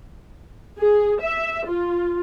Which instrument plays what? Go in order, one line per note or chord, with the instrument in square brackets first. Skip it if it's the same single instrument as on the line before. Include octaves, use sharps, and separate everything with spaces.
[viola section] G#4
E5
F4